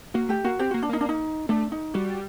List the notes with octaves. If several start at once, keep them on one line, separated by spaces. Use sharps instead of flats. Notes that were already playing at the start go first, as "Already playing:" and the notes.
A#3 F#4
A3 G4
A#3 F#4
C4 G4
A#3 F#4
D4
A#3 D#4
D4
D#4
A3 D4
D#4
G3 F#4